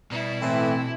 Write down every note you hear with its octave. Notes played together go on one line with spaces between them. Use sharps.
B2 G3 E4
A2 E3 C4